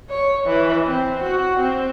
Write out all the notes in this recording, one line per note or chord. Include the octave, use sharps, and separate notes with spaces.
C#5
E3
C4
F#4
C4